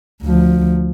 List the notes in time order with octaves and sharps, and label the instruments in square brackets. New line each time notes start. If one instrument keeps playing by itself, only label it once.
[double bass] D2 F3